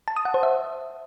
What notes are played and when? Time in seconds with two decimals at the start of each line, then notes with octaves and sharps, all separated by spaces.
0.08 A5
0.16 D#6
0.25 F#5
0.34 C5
0.43 E5